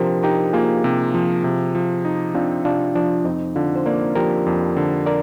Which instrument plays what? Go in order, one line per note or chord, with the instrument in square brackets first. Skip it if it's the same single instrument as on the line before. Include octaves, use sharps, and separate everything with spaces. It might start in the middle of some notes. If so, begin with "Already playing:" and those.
Already playing: [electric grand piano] C3 F3 [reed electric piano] D4 G4 A#4 C5
[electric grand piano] D#4 [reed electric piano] G4 A#4
[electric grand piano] A#3 [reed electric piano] F4 G#4
[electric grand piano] C3
F3
C3
F3
D#4
[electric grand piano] C4 [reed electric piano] D4 F4
[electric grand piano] C3 [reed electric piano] D4 F4
[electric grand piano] F3 [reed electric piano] D4
[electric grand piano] F2 [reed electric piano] C4 D#4
[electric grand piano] D3 [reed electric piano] D4 F4
[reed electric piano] C5
[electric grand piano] A#3 [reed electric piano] A#4 D5
[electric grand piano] F3 [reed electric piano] G4 A#4
[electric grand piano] F2
D3
[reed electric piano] A#4 D5